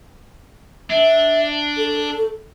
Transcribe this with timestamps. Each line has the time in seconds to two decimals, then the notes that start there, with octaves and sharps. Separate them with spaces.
0.90 D4 E5
1.78 A4